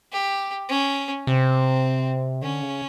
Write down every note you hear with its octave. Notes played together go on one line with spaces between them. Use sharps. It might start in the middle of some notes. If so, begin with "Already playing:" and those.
G4
C#4
C3 C4
D3 C#4
C#3